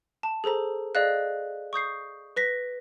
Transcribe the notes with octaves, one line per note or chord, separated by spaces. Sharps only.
A5
G#4 A4 C5 A#5
G#4 D5 D#5 F5 F#6
C#6 D#6 G6 C7
B4 A#6 B6